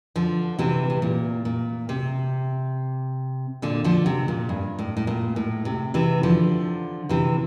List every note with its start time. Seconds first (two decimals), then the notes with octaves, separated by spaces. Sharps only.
0.16 D3 F3
0.59 C3 E3
0.90 C3
1.02 A#2
1.45 A#2
1.89 C3
3.62 A#2 D3
3.84 D3 F3
4.06 C3
4.28 A#2
4.49 G2
4.79 A2
4.97 A2
5.07 A#2
5.36 A2
5.65 C3
5.94 C3 E3
6.23 D3 F3
7.09 C3 E3